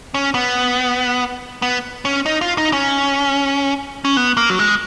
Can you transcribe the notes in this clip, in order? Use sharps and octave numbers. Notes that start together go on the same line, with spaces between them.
C#4
B3
B3
C#4
D#4
F4
D#4
C#4
C#4
B3
A#3
F#3
G#3